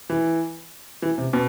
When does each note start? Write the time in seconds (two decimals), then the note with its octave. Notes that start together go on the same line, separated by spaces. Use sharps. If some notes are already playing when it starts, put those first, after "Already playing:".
0.10 E3
1.02 E3
1.18 C3
1.33 B2